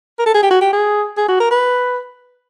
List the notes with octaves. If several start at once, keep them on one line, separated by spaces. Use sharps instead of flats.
A#4
A4
G#4
G4
F#4
G4
G#4
G#4
F#4
A#4
B4